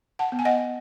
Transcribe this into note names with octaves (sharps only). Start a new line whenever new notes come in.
F#5 A5
B3
G#5
D#5 F#5